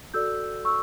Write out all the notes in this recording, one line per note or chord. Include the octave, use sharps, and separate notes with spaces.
F#4 A4 D5 E6 G6
C#6 E6